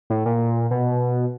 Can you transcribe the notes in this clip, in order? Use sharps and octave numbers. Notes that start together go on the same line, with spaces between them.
A2
A#2
B2